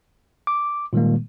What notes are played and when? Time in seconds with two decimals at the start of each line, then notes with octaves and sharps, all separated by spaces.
0.47 D6
0.93 A#2 D#3 G3 G#3 A#3